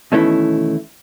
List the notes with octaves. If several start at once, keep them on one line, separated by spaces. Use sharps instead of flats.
B2 D#3 E3 A3 C#4 E4